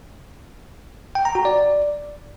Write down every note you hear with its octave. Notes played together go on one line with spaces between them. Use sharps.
G5
A#5
F#4
D5